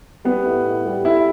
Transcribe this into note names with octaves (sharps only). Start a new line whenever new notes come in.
G3 B3
A2
A2
G3
A2 E4